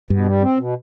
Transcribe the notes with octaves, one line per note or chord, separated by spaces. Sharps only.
G2 B2
G3
C4
B2